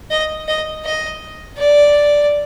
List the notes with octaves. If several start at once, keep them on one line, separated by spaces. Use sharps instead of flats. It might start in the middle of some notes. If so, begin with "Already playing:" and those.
D#5
D#5
D#5
D5